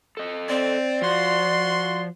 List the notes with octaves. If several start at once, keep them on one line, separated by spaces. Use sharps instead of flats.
A4 D#5
C4 D5
F3 F#4 C6